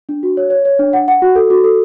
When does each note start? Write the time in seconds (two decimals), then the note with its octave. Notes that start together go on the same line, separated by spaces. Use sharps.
0.09 D4
0.23 F#4
0.37 C#5
0.50 C#5
0.65 C#5
0.79 D4
0.93 F#5
1.08 F#5
1.22 F#4
1.35 A4
1.50 F#4
1.64 A4